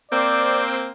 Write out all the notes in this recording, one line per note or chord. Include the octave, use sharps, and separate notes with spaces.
A#3 C4 D5